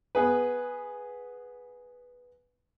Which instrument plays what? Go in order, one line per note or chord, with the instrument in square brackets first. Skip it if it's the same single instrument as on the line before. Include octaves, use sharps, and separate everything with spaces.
[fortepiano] B3 G#4 B4